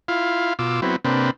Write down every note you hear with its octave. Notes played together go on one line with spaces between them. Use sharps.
E4 F4 F5
B2 F4 D6 E6
F#3 B3 C4 E4
C3 A#3 C4 D4 B4